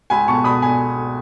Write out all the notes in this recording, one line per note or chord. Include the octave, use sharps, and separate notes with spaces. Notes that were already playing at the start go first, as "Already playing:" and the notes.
C#2 G#5 B5
B2 A5 C#6
B2 B5 D#6
B2 G#5 B5